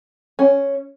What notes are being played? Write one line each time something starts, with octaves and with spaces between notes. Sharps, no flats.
C#4